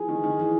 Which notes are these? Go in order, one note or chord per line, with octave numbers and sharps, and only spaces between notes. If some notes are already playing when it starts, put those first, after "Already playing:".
Already playing: E3 F3 G#4
D#3
D#3
E3